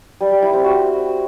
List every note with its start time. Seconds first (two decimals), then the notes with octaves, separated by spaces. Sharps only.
0.21 G3
0.31 G3
0.42 E4
0.53 C4
0.64 F#4